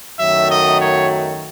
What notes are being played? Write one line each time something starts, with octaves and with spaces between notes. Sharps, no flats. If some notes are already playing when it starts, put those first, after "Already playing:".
F#2 D#3 F#3 A3 E5
D#5
C#5